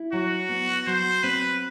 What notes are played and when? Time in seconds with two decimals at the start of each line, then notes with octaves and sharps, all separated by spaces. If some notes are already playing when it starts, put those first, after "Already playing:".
Already playing: E4
0.12 F#3 F#4
0.49 B3
0.87 F#3 C5
1.23 C4 B4